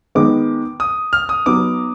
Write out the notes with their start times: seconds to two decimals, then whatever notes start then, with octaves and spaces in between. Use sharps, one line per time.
0.15 D#3 G#3 B3 D6
0.80 D#6
1.13 F6
1.29 D#6
1.46 F#3 B3 D#4 D6